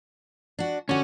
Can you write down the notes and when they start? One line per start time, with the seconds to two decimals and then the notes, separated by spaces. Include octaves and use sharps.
0.59 D4 F#4
0.89 D3 C#4 F#4